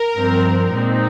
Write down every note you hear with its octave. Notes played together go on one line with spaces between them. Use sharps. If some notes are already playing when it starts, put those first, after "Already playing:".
Already playing: A#4
G2 F3 C4
A#2 G#3 C4 D#4